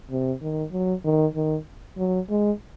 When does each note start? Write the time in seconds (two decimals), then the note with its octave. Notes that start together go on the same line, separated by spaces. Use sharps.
0.11 C3
0.42 D#3
0.72 F#3
1.05 D#3
1.35 D#3
1.98 F#3
2.30 G#3